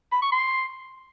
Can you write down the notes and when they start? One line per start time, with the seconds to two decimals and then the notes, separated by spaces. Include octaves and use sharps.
0.12 B5
0.22 C#6
0.32 C6